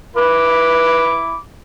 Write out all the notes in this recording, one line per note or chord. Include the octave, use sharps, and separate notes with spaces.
E4 B4 B5 D6